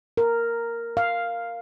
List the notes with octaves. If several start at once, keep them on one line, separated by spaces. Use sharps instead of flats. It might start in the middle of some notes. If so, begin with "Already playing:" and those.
A#4
F5